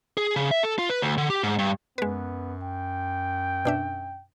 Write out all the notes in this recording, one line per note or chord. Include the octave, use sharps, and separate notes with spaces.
G#4
C#3
E5
A4
F4
B4
D2
D3
G4
G#2
G2
F#2 G#3 B3 B4
G5
B2 D4 E5